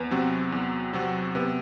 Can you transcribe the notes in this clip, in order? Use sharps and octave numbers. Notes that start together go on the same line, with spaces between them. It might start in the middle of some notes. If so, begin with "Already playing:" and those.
Already playing: E2 B3
C3 F#3 C4 F#4
E2
C3 F#3 C4 F#4
C3 B3